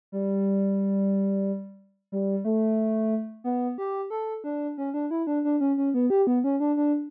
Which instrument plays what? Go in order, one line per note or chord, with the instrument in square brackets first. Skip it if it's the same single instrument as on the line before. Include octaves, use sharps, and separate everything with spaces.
[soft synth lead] G3
G3
A3
B3
G4
A4
D4
C#4
D4
E4
D4
D4
C#4
C#4
B3
G4
B3
C#4
D4
D4